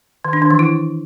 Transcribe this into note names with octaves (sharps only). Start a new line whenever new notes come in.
D#3
D4
D#3
E3
E4